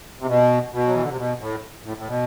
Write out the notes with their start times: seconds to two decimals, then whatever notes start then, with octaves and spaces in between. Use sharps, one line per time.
0.20 C3
0.27 B2
0.72 B2
0.87 F#3
0.94 E3
1.02 D3
1.09 C3
1.17 B2
1.40 A2
1.85 A2
1.97 A2
2.07 B2